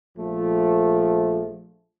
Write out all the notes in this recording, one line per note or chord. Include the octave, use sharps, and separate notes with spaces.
A#1 F3 A3